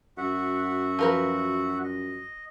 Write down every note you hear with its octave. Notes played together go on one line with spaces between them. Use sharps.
F#2 F#4 E5 F#5
F3 A#4 B4
D#5